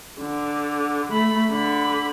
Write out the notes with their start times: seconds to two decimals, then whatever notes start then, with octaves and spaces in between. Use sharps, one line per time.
0.21 D3
1.12 A3 B5
1.53 D3 B5